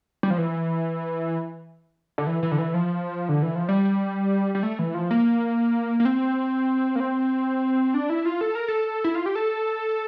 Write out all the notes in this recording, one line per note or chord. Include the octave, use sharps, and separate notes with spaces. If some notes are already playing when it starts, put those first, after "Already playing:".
G3
F3
E3
D3
E3
E3
D3
E3
F3
D3
E3
F3
G3
G3
A3
E3
F3
A#3
A#3
C4
A#3
C4
D4
E4
F4
A4
A#4
A4
E4
F4
G4
A4